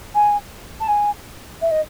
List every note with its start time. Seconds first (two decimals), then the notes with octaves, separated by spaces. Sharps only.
0.14 G#5
0.80 A5
0.88 G#5
1.61 E5
1.71 D#5